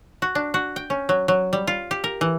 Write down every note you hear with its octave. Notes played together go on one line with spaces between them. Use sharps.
F#4
D4
F#4
G5
C#4
F#3
F#3
G3
F4
G4
A#4
E3